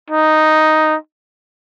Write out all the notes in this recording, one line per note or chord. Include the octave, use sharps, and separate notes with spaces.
D#4